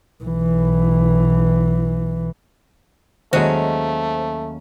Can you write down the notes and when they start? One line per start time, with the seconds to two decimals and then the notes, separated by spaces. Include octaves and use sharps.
0.23 B1 E3
3.33 D#2 F#3 G#3 A3 C#4 F#4 C5 F5